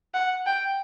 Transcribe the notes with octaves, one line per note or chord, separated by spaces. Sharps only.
F#5
G5